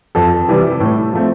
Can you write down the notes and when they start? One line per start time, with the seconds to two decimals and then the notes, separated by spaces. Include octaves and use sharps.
0.15 F2 A4
0.48 C3 E3 G3
0.80 A2
1.13 F3 A3 C4